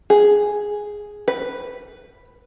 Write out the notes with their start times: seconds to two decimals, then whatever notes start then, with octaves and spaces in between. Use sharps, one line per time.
0.10 G#4
1.28 B4